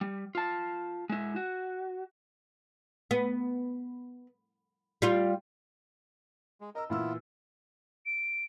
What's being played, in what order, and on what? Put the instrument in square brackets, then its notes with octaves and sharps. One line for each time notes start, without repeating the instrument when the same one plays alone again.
[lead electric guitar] G3
F4 A5
G#3 E4
F#4
[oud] B3
G3 F4
[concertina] G#3
[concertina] A#4 [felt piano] D#5 E6
[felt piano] A#2 E3 E6 [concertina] B3 E4 F4
[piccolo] D7